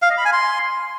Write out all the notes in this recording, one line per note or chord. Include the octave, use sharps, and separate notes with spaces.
F5
D#5
B5
G#5
C6